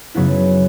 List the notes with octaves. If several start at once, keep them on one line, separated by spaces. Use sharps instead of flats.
F#2 C#3 F#3 B3 E4